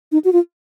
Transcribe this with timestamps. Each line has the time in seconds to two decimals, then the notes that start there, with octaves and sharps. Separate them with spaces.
0.12 D#4
0.24 F#4
0.33 F4